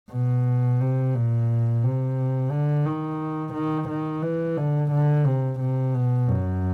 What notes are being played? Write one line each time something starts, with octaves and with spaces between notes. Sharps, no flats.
B2
C3
A#2
C3
D3
D#3
D#3
D#3
E3
D3
D3
C3
C3
B2
F#2